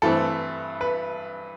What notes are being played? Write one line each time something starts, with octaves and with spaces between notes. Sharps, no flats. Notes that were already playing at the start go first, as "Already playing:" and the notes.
G2 E3 A3 C4 A4
B4